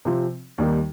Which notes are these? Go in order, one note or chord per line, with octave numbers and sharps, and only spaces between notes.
C3 F3 C4 F4
D#2 D#3 G3 D#4